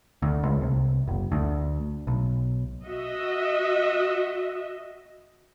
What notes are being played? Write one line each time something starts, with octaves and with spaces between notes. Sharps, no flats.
D2
C#2
C2
F#1
D2
B1
F#4 D#5 E5